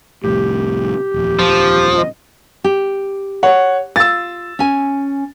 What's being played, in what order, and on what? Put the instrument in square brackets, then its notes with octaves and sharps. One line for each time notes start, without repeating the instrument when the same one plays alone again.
[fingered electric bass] C2 F2 A2 [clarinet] G4
[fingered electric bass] D#1 F2
[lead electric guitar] F3
[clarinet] D#5
[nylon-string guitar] G4
[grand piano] C#5 F#5
[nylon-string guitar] F4 [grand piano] E6 A6
[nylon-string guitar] C#4 G#5